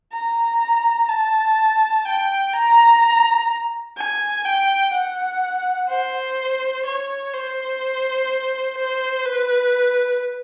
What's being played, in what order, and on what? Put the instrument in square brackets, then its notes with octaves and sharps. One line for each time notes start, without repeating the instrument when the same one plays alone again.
[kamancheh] A#5
A5
G5
A#5
G#5
G5
F#5
C5
C#5
C5
C5
B4